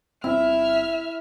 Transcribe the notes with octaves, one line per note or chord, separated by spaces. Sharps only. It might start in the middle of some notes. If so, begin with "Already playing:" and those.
G1 C4 E4 E5 F6